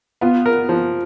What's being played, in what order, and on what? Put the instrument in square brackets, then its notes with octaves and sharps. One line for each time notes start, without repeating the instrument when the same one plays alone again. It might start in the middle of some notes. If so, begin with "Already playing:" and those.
[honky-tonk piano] B3 [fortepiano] F4
[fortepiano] A#4
F3